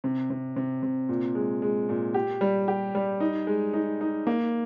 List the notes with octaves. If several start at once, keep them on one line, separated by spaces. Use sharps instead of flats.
C3
C3
C3
C3
A#2
G#3
G#3
A#2
G4
G3
G4
G3
D#4
G#3
D#4
D#4
A#3